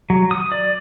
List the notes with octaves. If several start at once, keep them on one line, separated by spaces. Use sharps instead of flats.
F#3
D#6
D5